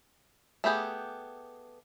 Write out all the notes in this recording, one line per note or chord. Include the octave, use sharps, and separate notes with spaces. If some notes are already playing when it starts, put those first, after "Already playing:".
A3 B3 G4 G#4